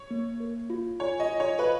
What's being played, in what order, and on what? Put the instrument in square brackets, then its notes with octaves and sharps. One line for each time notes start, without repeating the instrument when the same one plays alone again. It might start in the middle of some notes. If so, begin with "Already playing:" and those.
Already playing: [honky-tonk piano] C#5
[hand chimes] A#3
A#4
F4
[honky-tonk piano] C#5 [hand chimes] G#5
[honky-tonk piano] D#5
[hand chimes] F4
[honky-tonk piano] C#5
[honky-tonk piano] B4 [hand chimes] F5